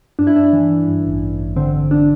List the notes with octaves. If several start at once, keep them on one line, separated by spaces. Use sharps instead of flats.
G2 D4
E4
G2 D4
E3
E3
G2
A1
A1
A1
D3 C4
D3
D4